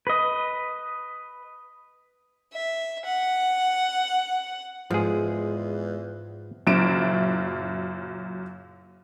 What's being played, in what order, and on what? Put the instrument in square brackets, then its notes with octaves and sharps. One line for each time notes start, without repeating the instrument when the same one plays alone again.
[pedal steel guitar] B4 D#5
[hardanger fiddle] E5
F#5
[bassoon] E2 [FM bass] G#2 [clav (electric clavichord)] F3 G#4 [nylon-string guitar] G#3
[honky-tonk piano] F#1 F#2 A#2 E4 D7 E7